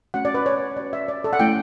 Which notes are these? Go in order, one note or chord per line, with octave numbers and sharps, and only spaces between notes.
A3 C#4 F#4 F#5
D5
B4
C#5
C#4 F#4 D5
E5
D5
A4
F#5
A3 C#4 E4 G5